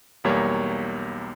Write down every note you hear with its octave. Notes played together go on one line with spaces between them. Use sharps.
B1 E2 G3 A#3 C#5